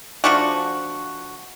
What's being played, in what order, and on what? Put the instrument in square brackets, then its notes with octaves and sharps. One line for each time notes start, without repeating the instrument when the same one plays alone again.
[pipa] F3 A3 D4 F#4